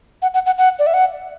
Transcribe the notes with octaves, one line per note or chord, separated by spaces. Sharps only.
F#5
F#5
F#5
F#5
D5
E5
F#5